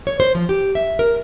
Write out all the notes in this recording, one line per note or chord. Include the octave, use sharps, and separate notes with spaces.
C#5
C5
F3
G4
E5
A#4